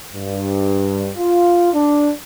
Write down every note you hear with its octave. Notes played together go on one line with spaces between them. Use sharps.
G2
F4
D4